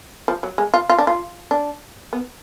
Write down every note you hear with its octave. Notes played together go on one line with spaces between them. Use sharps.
F3
F#3
G#3
F4
F4
D4
F4
D4
B3